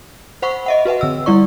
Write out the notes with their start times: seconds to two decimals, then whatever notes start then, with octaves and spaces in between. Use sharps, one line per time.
0.42 C5 F#5 B5 C#6
0.66 D#5 E5 F#5
0.85 F#4 B4 E5 F#5
1.01 D3 E6
1.26 G3 E4 D5 C#6